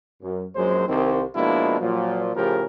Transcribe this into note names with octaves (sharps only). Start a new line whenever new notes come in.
F#2
A#1 F#2 F#3 G#3 C5
C2 D#3 C4
B2 F3 G#3 A#3 D4 E4
A#2 F3 F#3
A2 C#3 F3 G4 G#4 A#4